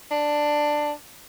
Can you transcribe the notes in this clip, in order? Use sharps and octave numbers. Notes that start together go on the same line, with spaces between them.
D4